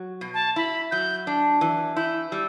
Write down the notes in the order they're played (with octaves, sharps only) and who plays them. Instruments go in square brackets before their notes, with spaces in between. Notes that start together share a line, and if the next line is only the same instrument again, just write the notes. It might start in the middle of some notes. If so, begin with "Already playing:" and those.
Already playing: [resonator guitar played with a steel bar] F#3
B2
[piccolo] A5
[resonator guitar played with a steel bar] E4 [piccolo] B5
[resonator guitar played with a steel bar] F#3 [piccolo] G6
[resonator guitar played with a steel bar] D4
E3
[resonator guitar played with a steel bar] E4 [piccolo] G6
[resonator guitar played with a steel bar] G3 [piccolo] E6